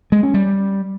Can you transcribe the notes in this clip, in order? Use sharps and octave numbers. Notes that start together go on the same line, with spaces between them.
G#3
C#4
G3